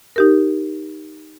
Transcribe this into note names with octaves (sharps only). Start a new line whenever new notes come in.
D#4 G4 A#4